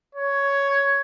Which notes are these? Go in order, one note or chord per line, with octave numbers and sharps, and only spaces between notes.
C#5